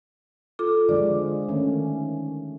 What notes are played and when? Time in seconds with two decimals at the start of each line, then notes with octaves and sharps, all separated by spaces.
0.59 F4 A4 D6
0.89 D3 F3 G#3 D5
1.49 D#3 A3 C#4